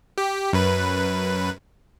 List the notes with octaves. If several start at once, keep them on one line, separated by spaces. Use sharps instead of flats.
G4
F#2 B4